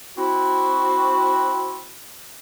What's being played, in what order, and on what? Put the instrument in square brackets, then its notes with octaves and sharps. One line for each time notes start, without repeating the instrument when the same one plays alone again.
[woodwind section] C4 E4 F#4